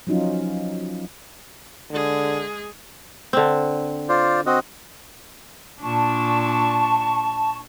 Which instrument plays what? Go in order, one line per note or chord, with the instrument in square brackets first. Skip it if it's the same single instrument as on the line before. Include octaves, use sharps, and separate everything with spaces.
[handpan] F3 F#3 C#4 D#4 F4
[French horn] D3 [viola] G#3 G#4
[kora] D3 C4
[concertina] F4 C5 D5
C4 F#4 D#5
[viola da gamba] A#2 D4 [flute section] A5 C#6